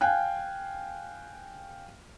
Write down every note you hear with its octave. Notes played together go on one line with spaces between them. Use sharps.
F5 G5 G#5 F#6